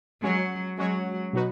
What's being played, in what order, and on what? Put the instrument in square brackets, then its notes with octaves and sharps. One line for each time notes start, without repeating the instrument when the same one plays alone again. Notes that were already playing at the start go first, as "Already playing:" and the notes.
[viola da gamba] F#3 [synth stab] G#3 C#4 F#4 C#5
[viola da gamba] F#3 [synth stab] G#3 C#4 F#4 C#5
[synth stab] B2 F#3 D#4 F#4 B4